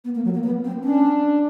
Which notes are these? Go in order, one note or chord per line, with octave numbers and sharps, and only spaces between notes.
B3
A#3
F#3
A#3
B3
C4
C#4 D4